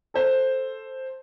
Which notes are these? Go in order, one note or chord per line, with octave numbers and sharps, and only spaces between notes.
A4 C5